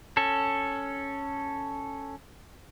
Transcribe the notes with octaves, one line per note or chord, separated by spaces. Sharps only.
C#4 A4